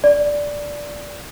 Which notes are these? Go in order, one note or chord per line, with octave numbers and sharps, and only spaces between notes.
D5